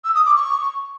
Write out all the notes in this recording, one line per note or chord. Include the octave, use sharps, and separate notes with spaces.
E6
D#6
D6
C#6